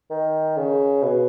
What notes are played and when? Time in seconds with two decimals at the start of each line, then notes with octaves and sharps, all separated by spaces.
0.10 D#3
0.57 C#3
1.02 B2